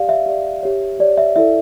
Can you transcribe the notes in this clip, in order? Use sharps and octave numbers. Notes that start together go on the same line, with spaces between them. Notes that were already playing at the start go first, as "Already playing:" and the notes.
Already playing: G4 D5 F5
E5
G4 D5
G4 C#5
G4 C#5 D5
E5
E4 A4 D5 E5